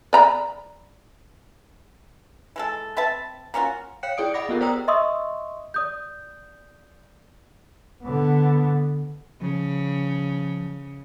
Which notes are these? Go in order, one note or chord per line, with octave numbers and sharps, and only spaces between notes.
D5 A#5 B5
E3 G#3 A4
C4 B4 E5 A5
A#3 C#4 F4 F#4
C#5 F5 G5 F#6 C#7
E4 G#4 D5 G5 D#6 D7
D#5 F#5 B5 D6 A#6
B3 F4 G4 G#4 A#4
C5 D5 G5 A#5 D#6 E6
D#5 E5 C6 C#6 D#6 E6
D5 D#6 G6
D3 B3
C#3 F3